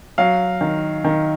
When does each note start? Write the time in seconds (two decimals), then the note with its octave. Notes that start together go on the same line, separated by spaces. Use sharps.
0.18 F#3 F5
0.61 D#3
1.04 D#3